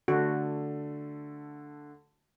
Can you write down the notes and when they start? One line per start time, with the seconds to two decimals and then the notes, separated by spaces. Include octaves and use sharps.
0.08 D3 A3 F#4